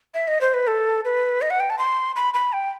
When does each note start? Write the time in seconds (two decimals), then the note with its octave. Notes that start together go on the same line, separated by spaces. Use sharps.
0.14 E5
0.28 D#5
0.41 C5
0.54 B4
0.67 A4
1.05 B4
1.41 D#5
1.50 F#5
1.60 G5
1.70 A5
1.78 C6
2.16 B5
2.34 B5
2.53 G5